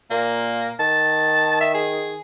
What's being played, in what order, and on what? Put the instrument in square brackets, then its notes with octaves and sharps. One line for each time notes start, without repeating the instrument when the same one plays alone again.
[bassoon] A#2 [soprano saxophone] A#3
[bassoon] D#3 [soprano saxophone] A5
[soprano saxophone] E5
G#4